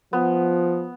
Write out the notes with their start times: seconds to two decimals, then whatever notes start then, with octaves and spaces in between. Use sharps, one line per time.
0.13 F3 B3